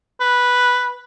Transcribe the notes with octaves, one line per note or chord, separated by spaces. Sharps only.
B4